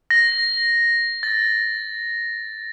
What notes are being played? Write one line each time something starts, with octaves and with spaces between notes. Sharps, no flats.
A#6
A6